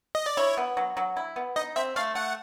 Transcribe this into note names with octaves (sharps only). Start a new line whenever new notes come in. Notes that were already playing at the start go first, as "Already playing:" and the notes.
D#5
D5
E4 C#5
B3
F#3
F#3
E4
B3
D#4 D#5
C4 E5
A3 F5
A3 F#5